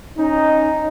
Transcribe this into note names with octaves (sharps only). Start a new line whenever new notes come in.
C#4 D#4